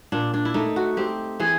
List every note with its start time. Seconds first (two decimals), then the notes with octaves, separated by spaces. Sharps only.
0.12 A#2 D4
0.34 D4
0.45 E4
0.54 A3 D#4
0.76 F#4
0.97 C4 G4
1.40 E3 G#4